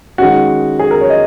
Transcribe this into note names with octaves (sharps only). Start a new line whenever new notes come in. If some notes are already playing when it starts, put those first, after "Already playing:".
D#3 G#3 C#4 F#4
G#4
A#4
C#5
D#5